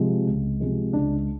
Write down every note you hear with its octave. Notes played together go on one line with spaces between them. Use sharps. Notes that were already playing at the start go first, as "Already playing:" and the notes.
Already playing: C3 F3 G#3
C#2
C3 F3 G#3
C#2 D4